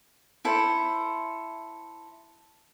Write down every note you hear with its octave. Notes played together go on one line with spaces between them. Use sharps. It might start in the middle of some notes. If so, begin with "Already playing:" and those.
E4 A4 C5